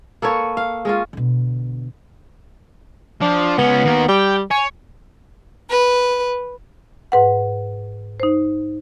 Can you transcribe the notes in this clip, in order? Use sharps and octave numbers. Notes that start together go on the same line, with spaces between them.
A#3 A4 B4 C#5
F5
G#3 C#4 F4
B2 D3
F3 D4
C#2 B3 C#4
D#3 A#3
G3 G5
C#5 G#5
B4
G#2 B4 F#5
D#4 C5